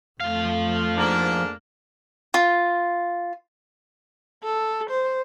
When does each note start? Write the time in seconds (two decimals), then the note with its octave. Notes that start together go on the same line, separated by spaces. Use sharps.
0.20 F2 F3 A3 F5
0.97 G#2 A#3 D4
2.34 F4
4.44 A4
4.90 C5